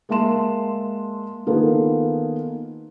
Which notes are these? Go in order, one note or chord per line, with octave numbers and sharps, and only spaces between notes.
G#3 A#3 E5 A5 C6 E7
D#3 A#3 B3 F4 G#4 A4